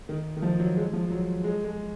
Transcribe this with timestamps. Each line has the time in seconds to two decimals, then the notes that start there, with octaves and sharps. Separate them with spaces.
0.09 D#3
0.37 D#3
0.42 F3
0.60 F#3
0.77 G#3
0.93 F3
1.10 F#3
1.44 G#3
1.64 G#3